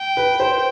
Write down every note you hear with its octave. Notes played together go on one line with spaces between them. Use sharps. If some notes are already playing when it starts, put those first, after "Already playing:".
Already playing: G5
B4
C5